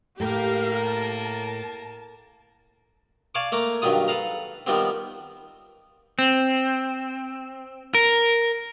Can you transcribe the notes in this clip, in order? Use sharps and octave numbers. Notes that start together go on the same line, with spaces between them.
A2 A#3 G4 A#4 F5
A5
D5 F5 G#5 A5 C#6 D6
A3 A#3 A#5 D6
G2 D#3 F#3 F4 D#6
A4 B4 F5 A#5
D#3 F3 G3 B3 C4
C4
A#4